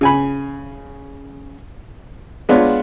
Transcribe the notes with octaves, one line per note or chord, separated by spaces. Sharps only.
C#3 G#5 B5
G#3 B3 D4 F4 C#5